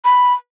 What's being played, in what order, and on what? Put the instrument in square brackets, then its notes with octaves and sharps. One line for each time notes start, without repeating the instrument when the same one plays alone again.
[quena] B5